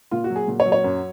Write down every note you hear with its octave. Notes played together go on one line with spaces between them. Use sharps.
A#2 F4
F#4
F#3
G#4
A#2
C#5
F#3
C#5
F#2